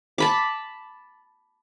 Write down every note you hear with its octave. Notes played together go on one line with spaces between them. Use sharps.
A5 B5 D6